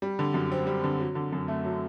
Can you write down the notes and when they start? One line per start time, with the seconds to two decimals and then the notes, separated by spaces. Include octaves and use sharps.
0.02 G3
0.19 D3
0.34 F#2
0.52 C4
0.67 G3
0.84 D3
1.00 F#3
1.15 D3
1.33 F#2
1.48 A3
1.64 F#3